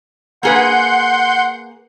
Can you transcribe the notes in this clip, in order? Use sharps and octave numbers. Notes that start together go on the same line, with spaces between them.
A#3 G#4 B4 F#5 C6 G6